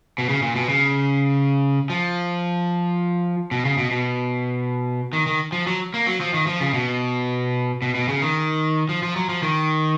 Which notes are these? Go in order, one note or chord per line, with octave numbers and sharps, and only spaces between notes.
B2
C#3
A#2
B2
C#3
F3
B2
C#3
B2
B2
D#3
D#3
F3
F#3
A#3
F#3
F3
D#3
F3
C#3
B2
B2
B2
C#3
D#3
F3
F3
F#3
F3
D#3